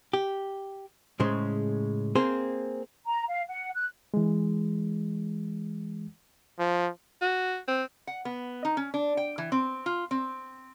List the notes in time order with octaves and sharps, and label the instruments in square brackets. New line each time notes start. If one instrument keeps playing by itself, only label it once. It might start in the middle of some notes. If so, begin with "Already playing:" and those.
[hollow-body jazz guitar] G4
A2 C#3 G#3 C5
A#3 C4 G#4 C5
[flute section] A#5
F5
F#5
F#6
[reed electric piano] E3 G#3
[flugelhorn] F3
[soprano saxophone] F#4
C4
[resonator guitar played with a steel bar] F#5
B3
D#4
C#4
D4
G5
E3
C4
F4
C4